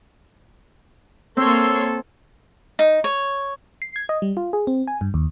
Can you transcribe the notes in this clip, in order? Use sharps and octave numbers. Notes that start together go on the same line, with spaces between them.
A#3 C4 A4 C#5 C6 E6
D#4
C#5
C7
G#6
D#5
G3
F4
G#4
C4
G#5
G2
D#2